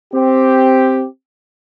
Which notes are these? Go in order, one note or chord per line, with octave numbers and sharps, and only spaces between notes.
C4 G4